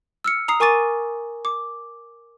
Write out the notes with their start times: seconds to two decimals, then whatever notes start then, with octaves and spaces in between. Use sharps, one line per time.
0.24 E6 F6 C#7
0.48 A#5 D#6 C7
0.60 A#4 G#5 C#6 D6 A6 D#7
1.45 D6